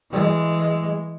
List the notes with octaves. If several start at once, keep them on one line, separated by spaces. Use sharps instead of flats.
E3 G#3